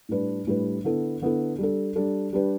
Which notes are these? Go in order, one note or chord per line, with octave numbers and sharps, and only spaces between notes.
A2 G3 D4 B4
A2 G3 D4 B4
D3 B3 E4 A4
D3 B3 E4 A4
G3 D4 A4
G3 D4 A4
G3 D4 G4 B4